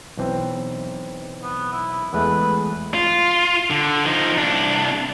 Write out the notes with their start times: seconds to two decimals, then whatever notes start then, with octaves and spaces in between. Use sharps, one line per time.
0.17 B1 E3 C4
1.43 B3
1.73 E4
2.13 E2 G#3 A3 B4
2.94 F4
3.70 D3
4.05 F3 D#4
4.38 C2 D4